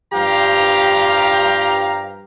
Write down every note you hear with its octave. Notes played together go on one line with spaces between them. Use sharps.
G2 F3 G4 F5 A#5